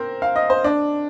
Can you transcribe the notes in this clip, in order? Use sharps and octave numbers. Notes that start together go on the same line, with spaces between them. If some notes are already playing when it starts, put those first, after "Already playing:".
Already playing: C4 A#4 C5
F5
D#5
C5
D4